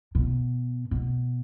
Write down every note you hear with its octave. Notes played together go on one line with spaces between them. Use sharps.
B2
B2